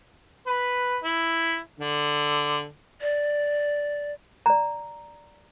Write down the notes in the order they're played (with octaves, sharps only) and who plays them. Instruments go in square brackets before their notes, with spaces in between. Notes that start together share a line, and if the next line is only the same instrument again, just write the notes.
[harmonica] B4
E4
D3
[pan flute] D5
[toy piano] D5 A#5